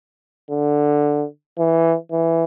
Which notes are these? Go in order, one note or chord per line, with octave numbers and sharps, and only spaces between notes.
D3
E3
E3